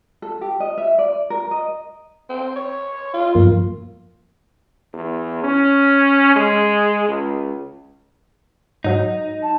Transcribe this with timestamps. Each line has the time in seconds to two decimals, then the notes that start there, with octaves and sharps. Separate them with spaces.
0.22 A4
0.41 G4
0.60 D#5
0.78 E5
0.98 D5
1.30 A#4
1.51 D#5
2.29 C4
2.56 C#5
3.13 F4
3.35 G2 F3 A#3
4.93 E2
5.44 C#4
6.36 G#3
7.09 C#2
8.84 G#2 F#3 D#4
9.43 A5